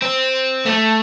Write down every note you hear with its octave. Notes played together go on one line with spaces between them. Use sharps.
C4
A3